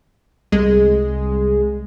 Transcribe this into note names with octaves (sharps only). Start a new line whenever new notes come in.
C2 G#3